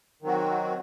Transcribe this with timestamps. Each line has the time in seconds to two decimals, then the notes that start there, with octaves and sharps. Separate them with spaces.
0.22 D#3 F#3 C4 F#4